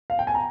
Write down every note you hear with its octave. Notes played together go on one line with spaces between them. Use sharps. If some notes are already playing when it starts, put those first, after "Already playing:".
F5
G5
G#5
A#5